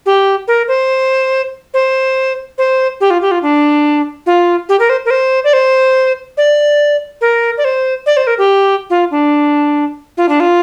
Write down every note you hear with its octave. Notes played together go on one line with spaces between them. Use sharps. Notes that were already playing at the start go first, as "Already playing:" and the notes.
G4
A#4
C5
C5
C5
G4
F4
G4
F4
D4
F4
G4
A#4
C5
A#4
C5
D5
C5
D5
A#4
D5
C5
D5
C5
A#4
G4
F4
D4
F4
D4
F4